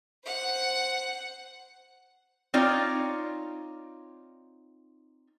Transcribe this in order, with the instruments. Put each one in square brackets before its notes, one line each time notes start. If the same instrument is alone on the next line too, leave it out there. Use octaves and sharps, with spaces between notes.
[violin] C5 F#5
[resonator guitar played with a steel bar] C4 D#4 F4 C#5 D5